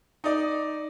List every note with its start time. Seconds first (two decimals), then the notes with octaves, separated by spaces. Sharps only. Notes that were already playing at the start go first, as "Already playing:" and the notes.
0.24 D#4 D5